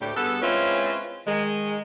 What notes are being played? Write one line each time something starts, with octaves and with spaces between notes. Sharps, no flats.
D2 A2 D3 G4
G2 B3 G#4 A4
G#3 C4 C#4 E4 F4 B4
D#3 G#3